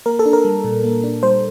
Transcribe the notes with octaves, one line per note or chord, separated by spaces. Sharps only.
A#3 A#4
A4
D4
A#4
G3
A#2
A#3
D4
G3 C5